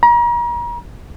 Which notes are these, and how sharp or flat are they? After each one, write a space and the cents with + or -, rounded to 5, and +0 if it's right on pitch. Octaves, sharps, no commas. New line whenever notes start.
A#5 +40